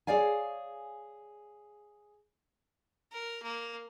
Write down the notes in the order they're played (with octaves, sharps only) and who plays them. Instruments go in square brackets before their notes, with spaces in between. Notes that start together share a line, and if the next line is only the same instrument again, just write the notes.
[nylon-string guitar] G#4 C#5 D5 F5 G#5
[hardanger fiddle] A#4
A#3